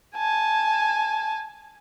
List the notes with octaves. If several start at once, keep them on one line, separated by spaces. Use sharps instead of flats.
G#5 A5